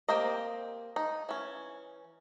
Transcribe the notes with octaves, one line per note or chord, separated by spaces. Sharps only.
A#3 C4 G4 A#4 D#5
D#4
E3 C#4